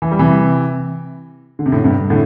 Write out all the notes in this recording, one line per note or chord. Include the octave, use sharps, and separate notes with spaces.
E3
G3
C3 E3
D3
C3
A2 D3
G2 C3
A2 D3